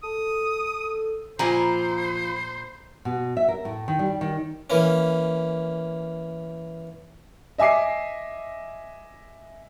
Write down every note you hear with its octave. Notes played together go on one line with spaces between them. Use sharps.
A4 D#6
A#2 F3 C5 G#5 A#5 B5
B2
E5
A#4
A2
D#3
G3
D#3
E3 A#3 C#4
D#5 E5 G#5 D6 C7